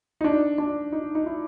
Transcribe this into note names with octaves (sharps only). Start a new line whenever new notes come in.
D#4
D4
D4
D#4
D#4
E4